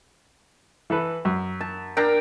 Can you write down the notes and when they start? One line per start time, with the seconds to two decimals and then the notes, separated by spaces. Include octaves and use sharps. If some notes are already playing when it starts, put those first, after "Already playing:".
0.90 E3 A4 B4
1.25 F#2
1.61 A5
1.97 D4 A#4 G5